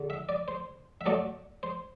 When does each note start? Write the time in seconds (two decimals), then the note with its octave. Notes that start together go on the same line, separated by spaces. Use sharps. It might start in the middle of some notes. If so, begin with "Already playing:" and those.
Already playing: E2 D3
0.10 E5
0.29 D5
0.48 C5
1.01 E5
1.06 G2 F#3 A3 D5
1.63 C5